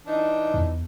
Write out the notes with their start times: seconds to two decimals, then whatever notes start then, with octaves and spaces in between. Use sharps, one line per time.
0.06 E3 D4 D#4
0.54 E2